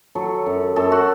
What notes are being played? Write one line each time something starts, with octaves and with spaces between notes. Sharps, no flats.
F#3 A4
F#2
F#2 A4
F#4